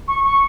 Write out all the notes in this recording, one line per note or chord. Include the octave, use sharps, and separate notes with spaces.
C#6
C#6